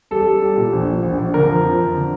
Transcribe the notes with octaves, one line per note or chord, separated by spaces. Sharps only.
G3 A4
G3
G3
A#2
A#1
A#2
A#1
A#1
D3 A#4
F2
F3
F2
D3